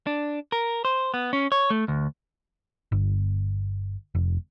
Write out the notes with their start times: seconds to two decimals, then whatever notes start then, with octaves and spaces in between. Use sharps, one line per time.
0.07 D4
0.52 A#4
0.85 C5
1.14 B3
1.33 C#4
1.52 C#5
1.70 A3
1.88 D2
2.92 G1
4.15 F1